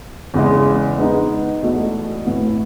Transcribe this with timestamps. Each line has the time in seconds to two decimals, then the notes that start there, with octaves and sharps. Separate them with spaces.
0.34 E2 C#3 G#3
0.98 G#3 B3 D#4
1.62 E2 B2 A3
2.27 A2 E3 B3 E4